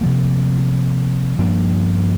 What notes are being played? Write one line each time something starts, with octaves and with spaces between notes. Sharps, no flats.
C3 F3 A#3
G2 F3 A#3 D4